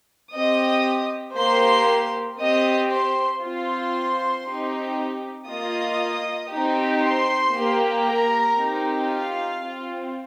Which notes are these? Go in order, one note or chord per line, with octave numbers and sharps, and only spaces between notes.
C4 G4 D#5 D#6
A#3 G4 C5 C6
C4 G4 D#5 D#6
C5 C6
C4 F4 C5 C6
C4 D#4 G4
A#3 F4 D#5 D#6
C4 D#4 G4
C5 C6
A#3 G4
A#4 A#5
C4 D#4 G4
F4 F5
C4 F4